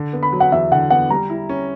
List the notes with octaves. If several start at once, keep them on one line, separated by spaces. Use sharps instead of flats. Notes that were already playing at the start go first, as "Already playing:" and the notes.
Already playing: D3
B3
B5
F#3
F#5
E2 E5
D3 F#5
B3 F#5
G3 A#5
E4
C#4